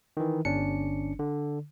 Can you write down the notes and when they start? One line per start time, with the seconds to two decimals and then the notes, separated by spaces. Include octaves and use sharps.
0.17 D#3 E3
0.45 G1 C#4 D4 C#7
1.19 D3